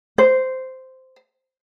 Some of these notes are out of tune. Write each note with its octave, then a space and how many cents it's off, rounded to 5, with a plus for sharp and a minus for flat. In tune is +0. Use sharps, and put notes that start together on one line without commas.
C5 -10